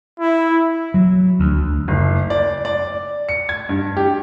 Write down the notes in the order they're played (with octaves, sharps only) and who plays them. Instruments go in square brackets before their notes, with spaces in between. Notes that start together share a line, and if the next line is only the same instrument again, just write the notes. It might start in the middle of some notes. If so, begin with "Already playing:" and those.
[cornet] E4
[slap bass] F#3
D2
[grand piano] F#1
D5
D5
C#7
G#6
G2
G4